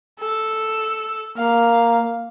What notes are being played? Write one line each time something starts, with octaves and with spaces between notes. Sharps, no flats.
A4
A#3 F5